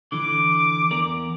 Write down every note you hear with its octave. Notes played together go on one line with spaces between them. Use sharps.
D3 E3 D6
E2 A#4 D5